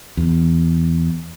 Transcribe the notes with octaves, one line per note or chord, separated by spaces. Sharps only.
E2